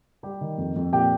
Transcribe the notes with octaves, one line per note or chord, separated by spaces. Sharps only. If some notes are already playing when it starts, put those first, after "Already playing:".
G3 G4
D#3
F2
F2
A#2 G4 G5